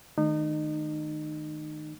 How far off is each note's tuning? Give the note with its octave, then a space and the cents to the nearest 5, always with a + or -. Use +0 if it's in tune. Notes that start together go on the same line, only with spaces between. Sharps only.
D#3 +0 A3 -20 D#4 -30